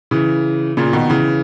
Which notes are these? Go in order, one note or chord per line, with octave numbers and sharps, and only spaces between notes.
C#3 E3
A#2 C#3
B2 D#3
C#3 E3